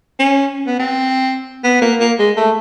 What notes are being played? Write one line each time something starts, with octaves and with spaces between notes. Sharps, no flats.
C#4
B3
C4
B3
A#3
A#3
G#3
A3